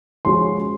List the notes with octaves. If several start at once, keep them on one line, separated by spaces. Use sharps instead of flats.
F3 G#3 C#4 F#4 C6